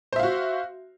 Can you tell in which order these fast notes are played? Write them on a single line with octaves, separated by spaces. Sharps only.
C5 E5 F5 F#4